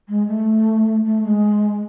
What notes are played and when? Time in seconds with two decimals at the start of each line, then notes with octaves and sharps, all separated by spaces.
0.08 G#3
0.28 A3
1.05 A3
1.24 G#3